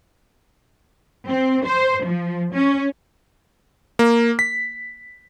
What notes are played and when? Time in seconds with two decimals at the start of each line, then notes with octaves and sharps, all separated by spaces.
1.29 C4
1.66 C5
2.05 F3
2.54 C#4
3.99 A#3
4.39 B6